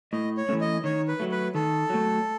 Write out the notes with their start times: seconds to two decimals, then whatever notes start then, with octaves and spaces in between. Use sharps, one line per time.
0.13 A2 D#5
0.37 C#5
0.49 E3 A3 C#4
0.61 D#5
0.84 D#3 C#5
1.08 B4
1.20 F#3 A3
1.32 B4
1.55 D#3 A4
1.90 F#3 A3